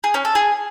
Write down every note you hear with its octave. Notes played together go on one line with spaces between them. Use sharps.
G#4
C#4
A4
G#4